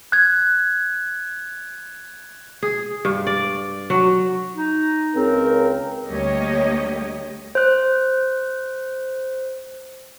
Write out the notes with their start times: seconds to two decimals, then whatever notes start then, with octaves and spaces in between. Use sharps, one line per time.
0.12 F#6 G#6
2.63 G#4
3.05 G2
3.27 D5
3.90 F#3
4.56 D#4
5.16 C#2 C#3 C4 A#4
6.09 D2 G3 A#3 G4 C#5 D#5
7.55 C5 F#6